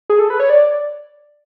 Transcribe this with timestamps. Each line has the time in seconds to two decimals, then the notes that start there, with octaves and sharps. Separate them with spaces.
0.10 G#4
0.19 A4
0.30 B4
0.40 C#5
0.50 D5